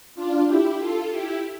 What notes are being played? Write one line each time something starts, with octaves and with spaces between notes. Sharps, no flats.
D4 F4
E4 G4
F4 A4
E4 G4